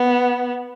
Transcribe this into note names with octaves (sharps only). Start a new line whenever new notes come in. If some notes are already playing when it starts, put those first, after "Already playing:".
Already playing: B3